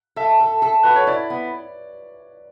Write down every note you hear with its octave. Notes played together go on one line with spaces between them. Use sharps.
A4 E5
A4
A4
F#4 B4
C#5
E4 D5
B3